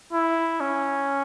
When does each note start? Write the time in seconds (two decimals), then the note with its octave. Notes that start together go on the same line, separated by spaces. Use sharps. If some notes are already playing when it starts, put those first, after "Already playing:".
0.13 E4
0.60 C#4